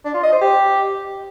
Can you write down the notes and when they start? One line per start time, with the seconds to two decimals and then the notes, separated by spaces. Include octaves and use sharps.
0.05 D4
0.14 F4
0.23 D#5
0.32 C5
0.41 G4